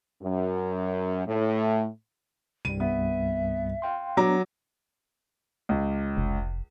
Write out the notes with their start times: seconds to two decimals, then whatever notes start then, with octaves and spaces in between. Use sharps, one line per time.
0.22 F#2
1.26 A2
2.65 C2 G2 G3 D#7
2.80 B3 E5
3.82 F5 G5 C6
4.17 F#3 B3 D4 A#5 D6
5.69 C#2
6.17 F1